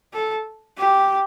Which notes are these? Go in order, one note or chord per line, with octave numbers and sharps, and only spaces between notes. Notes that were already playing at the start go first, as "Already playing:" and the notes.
A4
G4